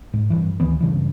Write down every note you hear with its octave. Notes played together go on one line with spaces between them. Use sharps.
G#2
G2 E3
D2 D#3 E3 B3
G2 C#3 E3